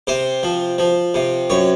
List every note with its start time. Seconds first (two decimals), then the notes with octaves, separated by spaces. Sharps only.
0.07 C3 C5
0.43 F3
0.78 F3
1.14 C3
1.50 F#2 C#5